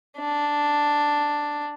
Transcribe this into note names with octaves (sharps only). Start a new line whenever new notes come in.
D4